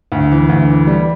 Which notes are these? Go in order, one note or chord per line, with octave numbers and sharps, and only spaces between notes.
D2
E3
D2
E3
G3